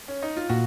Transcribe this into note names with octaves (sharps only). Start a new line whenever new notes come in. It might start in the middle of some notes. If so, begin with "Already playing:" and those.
C#4
D#4
F4
A#2 F#4